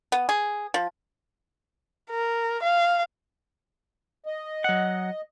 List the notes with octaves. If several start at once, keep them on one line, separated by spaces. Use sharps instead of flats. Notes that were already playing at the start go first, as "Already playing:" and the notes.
B3
G#4
F3
A#4
F5
D#5
F#3 F#5